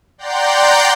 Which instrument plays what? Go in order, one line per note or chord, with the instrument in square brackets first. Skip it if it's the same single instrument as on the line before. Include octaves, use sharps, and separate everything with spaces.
[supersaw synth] D5 F#5 G5 A#5 C6 G6